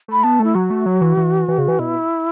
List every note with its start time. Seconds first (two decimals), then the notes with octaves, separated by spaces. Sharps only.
0.08 A3 B5
0.23 B3 A5
0.40 A3 E4
0.55 F#3 F#4
0.70 A3
0.86 F#3
1.01 E3
1.17 E3
1.48 E3
1.58 C#3
1.68 E3
1.79 B2 E4